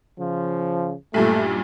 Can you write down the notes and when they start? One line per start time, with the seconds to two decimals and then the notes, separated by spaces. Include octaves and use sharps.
0.18 C#3 F3
1.14 B1 G2 A#2 A3